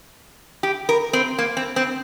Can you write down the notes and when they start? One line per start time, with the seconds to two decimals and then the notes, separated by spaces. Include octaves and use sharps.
0.63 G4
0.89 A#4
1.13 C4
1.38 A#3
1.57 C4
1.76 C4